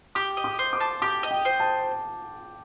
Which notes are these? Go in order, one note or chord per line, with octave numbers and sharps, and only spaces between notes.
G4 D6
D#5
D6
C5
D6
A5
G4 D6
D#5
G5
C5
A5